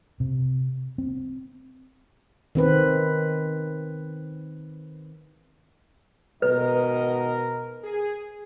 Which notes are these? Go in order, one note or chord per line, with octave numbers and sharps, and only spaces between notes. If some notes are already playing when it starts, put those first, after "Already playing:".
C3
C4
D#3 C4 B4
G#2 B2 D#3 A#4 B4 D#5
G#4